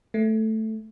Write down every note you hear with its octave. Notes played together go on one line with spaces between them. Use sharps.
A3